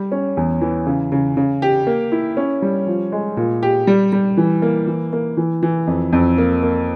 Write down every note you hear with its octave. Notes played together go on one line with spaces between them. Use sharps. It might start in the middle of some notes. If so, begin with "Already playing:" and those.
Already playing: G3
C#4
E2
E3
C#3
C#3
C#3
G4
A#3
E4
C#4
G3
F3
G#3
A#2
G4
G3
G3
E3
A#3
E3
A#3
E3
E3
F2
F2
A#3
A#3